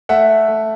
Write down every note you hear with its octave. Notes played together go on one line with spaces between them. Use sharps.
A3 E5 F#5
A3